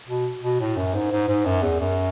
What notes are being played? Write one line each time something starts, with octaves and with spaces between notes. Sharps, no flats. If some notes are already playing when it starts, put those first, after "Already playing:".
B2
B2
A2
F#2
G#2
G#2
G#2
F#2
E2
F#2